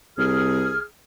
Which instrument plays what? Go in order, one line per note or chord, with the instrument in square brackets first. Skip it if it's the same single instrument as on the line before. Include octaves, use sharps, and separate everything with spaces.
[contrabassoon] C2 [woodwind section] G#4 F6